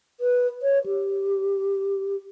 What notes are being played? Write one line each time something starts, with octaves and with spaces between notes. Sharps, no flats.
B4
C#5
G4